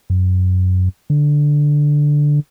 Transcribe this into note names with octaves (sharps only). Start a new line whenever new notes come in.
F#2
D3